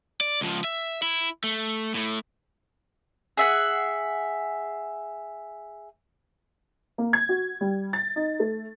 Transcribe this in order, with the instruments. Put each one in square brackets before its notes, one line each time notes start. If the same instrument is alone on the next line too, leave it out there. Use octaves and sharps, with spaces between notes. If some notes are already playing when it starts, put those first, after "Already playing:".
[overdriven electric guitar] D5
C#2 F3
E5
E4
A3
A2 A3
[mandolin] G#4 E5 F#5
[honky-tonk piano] A#3
G#6
F#4
G3
A6
D#4
A3